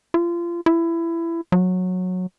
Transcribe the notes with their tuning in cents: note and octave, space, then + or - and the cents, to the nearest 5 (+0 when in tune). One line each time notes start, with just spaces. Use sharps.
F4 -30
E4 +20
F#3 -15